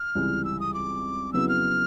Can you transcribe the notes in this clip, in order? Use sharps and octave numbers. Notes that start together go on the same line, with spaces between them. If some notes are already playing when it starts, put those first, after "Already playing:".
Already playing: F6
C#2 C3 E3 G3
E6
D#6
D6
F2 C#3 F#3 B3 E4 E6
F6